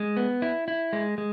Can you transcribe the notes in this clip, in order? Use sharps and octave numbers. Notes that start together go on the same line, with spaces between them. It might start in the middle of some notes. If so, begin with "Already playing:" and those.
Already playing: G#3
B3
E4
E4
G#3
G#3